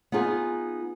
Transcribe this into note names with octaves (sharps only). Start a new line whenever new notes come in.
B3 D#4 F4 G#4